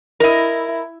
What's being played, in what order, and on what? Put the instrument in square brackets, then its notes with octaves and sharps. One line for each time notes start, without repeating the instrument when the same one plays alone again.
[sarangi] E4 [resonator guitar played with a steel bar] A#4 D#5